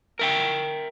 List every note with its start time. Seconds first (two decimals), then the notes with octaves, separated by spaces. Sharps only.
0.19 A#4 E5 G5